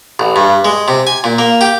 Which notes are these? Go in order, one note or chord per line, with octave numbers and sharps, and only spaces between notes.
A1
G2
G#3
C3
G#5
A#2
A#3
G4